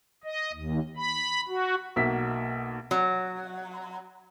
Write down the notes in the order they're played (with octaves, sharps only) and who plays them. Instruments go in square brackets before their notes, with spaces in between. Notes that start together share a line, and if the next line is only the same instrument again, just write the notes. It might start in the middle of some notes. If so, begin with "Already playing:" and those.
[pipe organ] D#5
D#2
B5
F#4
[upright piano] B1 A#3 F#4 E5 B6
[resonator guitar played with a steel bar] F#3